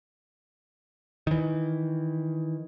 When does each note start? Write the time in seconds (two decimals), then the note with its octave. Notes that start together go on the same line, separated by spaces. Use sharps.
1.27 D#3 E3